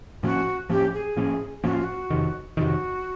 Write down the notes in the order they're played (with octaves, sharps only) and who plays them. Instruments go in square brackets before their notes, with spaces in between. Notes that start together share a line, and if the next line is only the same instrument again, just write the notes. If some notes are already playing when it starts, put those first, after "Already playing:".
[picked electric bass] A2 F3 A#3 C#4 [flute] F#4
[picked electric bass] A2 F3 A#3 C#4 [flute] G4
[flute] G#4
[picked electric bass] A2 F3 A#3 C#4
[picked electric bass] A2 F3 A#3 C#4 [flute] F#4
[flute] F4
F#4
[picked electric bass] F2 C3 D#3
[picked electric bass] F2 C3 D#3 [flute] F#4